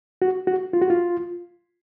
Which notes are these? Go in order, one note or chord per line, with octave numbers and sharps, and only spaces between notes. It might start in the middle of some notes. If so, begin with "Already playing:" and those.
F#4
F#4
F4
F#4
F4